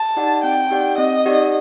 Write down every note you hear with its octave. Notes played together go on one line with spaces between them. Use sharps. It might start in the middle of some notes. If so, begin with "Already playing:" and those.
Already playing: A5
D#4 G4 D5 F#5
C4 G5
D#4 G4 D5 F#5
C4 D#5
D#4 G4 D5 F#5